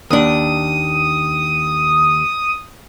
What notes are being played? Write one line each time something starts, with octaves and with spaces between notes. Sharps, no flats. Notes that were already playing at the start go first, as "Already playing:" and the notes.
D#2 D4 D#6